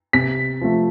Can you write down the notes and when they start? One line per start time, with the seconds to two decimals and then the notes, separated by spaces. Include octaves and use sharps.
0.13 C3 B6
0.61 F3 A3